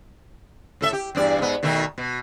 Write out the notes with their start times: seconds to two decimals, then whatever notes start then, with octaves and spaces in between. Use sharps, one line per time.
0.81 A2 A4 E5
0.93 G4
1.15 E2 G2 D5
1.38 G#2 B3
1.63 B2 D#3 A3
1.98 B2